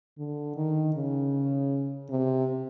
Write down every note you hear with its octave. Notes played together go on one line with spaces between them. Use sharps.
D3
D#3
C#3
C3